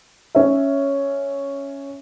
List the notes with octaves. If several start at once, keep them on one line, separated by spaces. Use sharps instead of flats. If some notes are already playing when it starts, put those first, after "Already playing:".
C#4 E5